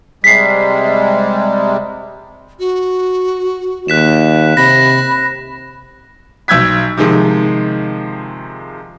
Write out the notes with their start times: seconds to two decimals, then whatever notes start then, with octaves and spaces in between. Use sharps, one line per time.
0.24 C3 G3 G#3 B6 C7
2.59 F#4
3.88 D#2 F#6 B6 E7
4.57 C3 B5 A#6
6.48 B1 E6 G6 G#6 B6
6.97 C3 D#3 F3 G#3